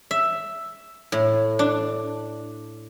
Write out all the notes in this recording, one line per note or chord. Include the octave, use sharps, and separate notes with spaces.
E5
A2
D4